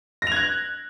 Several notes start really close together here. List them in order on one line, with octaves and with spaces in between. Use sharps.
A#6 F7 G#6 F#6